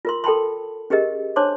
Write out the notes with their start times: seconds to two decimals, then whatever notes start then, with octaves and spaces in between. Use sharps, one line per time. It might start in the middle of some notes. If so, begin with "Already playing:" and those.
0.05 F4 A#4 C6
0.24 A4 A#4 G5 A5 B5 C6
0.90 C#4 G4 G#4 A#4 D#5
1.36 D4 C5 C#5 A5 C6 D6